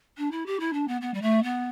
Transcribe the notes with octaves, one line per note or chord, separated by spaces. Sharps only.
D4
E4
G4
E4
D4
B3
B3
G3
A3
B3